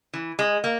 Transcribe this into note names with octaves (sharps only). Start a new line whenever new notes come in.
E3
G#3
A#3